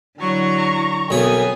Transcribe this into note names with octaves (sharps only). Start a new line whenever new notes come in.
D3 F#3 E4 A#5 C#6
B1 B3 C4 A#4 C#5 G#5 D#6